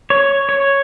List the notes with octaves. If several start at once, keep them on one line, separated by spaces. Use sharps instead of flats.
C#5
C#5